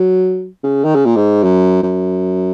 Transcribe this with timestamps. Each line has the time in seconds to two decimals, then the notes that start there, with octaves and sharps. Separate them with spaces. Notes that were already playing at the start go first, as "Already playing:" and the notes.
Already playing: F#3
0.64 C#3
0.84 D#3
0.95 C#3
1.06 A#2
1.16 G#2
1.43 F#2
1.83 F#2